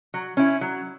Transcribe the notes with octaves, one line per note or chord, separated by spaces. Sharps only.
F#3
C#4 E4
F#3